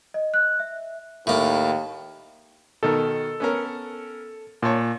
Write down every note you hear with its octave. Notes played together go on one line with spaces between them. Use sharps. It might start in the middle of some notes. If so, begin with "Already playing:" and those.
D#5
F#6
E5
D#2 A2 A#3
B2 D#3 A4 A#4
B3 C#4 A#4
A#2 C#5 A5 C6